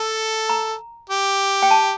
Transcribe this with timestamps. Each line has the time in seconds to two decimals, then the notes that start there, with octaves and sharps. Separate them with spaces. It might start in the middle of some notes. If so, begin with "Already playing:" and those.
Already playing: A4 A5
0.49 A#5
1.10 G4
1.63 G5
1.71 A5